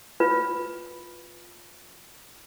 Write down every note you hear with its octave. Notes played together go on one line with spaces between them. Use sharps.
F4 B4